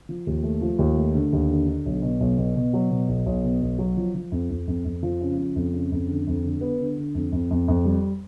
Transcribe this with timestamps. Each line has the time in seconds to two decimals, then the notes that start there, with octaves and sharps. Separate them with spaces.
0.09 F3
0.27 D#2
0.43 A3
0.61 F3
0.79 D#2
0.97 A3
1.14 D3
1.33 D#2
1.50 D3
1.67 D3
1.86 B1
2.02 B2
2.20 B1
2.38 B2
2.56 B2
2.73 F#3
2.91 B2
3.08 B1
3.26 B1
3.44 B2
3.62 B1
3.79 F#3
3.97 F3
4.15 F3
4.32 F2
4.50 F2
4.67 F2
4.85 F2
5.03 F3
5.20 C#3
5.38 F3
5.56 F2
5.73 C#3
5.92 F2
6.08 D3
6.27 F2
6.44 D3
6.61 B3
6.80 D3
6.97 D3
7.15 F2
7.32 F2
7.51 F2
7.68 F2
7.85 G3